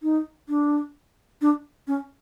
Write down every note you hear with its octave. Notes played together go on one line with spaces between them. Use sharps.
D#4
D4
D4
C#4